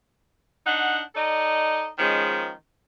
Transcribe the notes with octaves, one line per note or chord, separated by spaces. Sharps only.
D4 D#4 F#5
D#4 A4 D5 D#5
D#3 F3 G#3 C#4